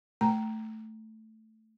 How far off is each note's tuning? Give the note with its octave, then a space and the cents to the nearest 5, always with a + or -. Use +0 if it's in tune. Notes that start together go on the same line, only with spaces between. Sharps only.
A3 +0 A#5 +0